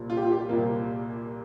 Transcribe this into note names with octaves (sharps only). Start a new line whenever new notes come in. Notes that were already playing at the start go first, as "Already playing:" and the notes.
Already playing: C2 A#2 F3
F4
G4
F4
G4
F4
C2 A#2 F3 A#3